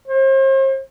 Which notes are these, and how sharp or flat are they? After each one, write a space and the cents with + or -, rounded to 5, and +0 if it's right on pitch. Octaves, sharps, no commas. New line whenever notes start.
C5 +40